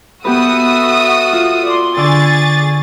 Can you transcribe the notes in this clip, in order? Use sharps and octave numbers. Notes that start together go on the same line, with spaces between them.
B3 F#4 G4 A4 B4 E5 D#6
F4
D5 C6
D3 G#4 D5 C#6 D6 A6